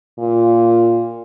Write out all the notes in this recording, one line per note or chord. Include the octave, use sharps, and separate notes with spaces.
A#2